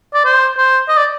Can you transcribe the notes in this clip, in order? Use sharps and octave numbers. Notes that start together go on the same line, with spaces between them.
D5
C5
C5
D#5
D5